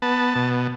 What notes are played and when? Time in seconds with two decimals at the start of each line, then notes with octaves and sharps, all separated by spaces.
0.02 B3 A5
0.36 B2